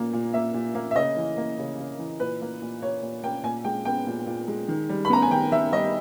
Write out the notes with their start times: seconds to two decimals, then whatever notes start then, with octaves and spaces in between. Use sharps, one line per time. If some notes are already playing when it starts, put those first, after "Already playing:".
Already playing: A#2 A#3
0.13 A#2
0.33 A#3 E5
0.54 A#2
0.75 A#3
0.91 E5
0.96 C#3 D#5
1.17 E3
1.37 A#3
1.58 C#3
1.79 C#3
1.99 E3
2.20 A#2 B4
2.41 A#3
2.62 A#2
2.82 A#3 C#5
3.03 A#2
3.23 A#3 G5
3.44 A#2 G#5
3.64 G#3 G5
3.85 B3 G5
4.07 A#2
4.27 A#2
4.48 G#3
4.68 D#3
4.89 G3
5.05 B5
5.10 B3 A#5
5.22 G#5
5.31 D#3 G5
5.52 D#3 E5
5.72 G3 D#5